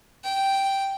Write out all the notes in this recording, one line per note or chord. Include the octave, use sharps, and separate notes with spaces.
G5